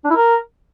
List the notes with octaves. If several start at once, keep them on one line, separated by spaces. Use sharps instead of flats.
D4
E4
A#4